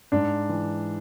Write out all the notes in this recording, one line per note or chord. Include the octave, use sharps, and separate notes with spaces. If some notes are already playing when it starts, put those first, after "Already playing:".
G#2 D4
E3